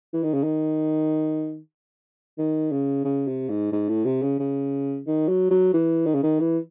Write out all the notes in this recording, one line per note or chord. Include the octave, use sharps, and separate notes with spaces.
E3
D#3
C#3
D#3
D#3
C#3
C#3
C3
G#2
G#2
A2
C3
C#3
C#3
D#3
F#3
F#3
E3
D#3
C#3
D#3
E3